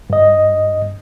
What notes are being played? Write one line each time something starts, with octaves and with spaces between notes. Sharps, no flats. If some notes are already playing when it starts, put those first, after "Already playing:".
G2 D#5